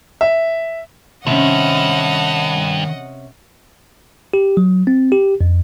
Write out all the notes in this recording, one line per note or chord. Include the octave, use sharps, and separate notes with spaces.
E5
G2 C3 D#3 C#4 C5 D#5 F#5
G4
F#3
C4
G4
F2